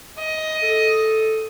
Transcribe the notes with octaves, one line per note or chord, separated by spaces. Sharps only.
D#5
A4